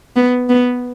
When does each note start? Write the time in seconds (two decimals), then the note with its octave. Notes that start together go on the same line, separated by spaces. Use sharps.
0.16 B3
0.49 B3